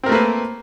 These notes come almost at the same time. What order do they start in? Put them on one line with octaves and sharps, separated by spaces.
C4 A#4 A3 A#3 B4